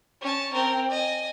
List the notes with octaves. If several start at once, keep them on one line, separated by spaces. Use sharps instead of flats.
C#4 A5
C4 A#4
D#5 G#5